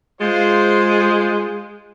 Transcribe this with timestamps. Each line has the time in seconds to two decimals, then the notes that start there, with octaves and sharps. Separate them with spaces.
0.21 G#3 F4 C5